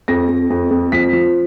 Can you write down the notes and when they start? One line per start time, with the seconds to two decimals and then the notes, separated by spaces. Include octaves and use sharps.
0.08 F2 A#6
0.29 F2
0.50 F2
0.71 F2
0.92 F3 B6
1.13 F3